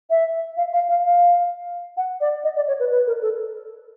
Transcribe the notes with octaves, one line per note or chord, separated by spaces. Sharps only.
E5
F5
F5
F5
F5
F#5
D5
D#5
D5
C#5
B4
B4
A#4
A4